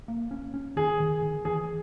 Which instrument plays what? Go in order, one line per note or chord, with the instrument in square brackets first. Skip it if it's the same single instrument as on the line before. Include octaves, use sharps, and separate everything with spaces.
[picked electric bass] A#3
C#4
C#4
[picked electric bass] D#3 [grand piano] G#4
[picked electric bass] D#3
D#3
[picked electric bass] E3 [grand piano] G#4